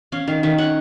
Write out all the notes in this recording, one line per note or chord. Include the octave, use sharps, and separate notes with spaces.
C#4 F5
D#3 F5
D#3 E5
C#4 F#5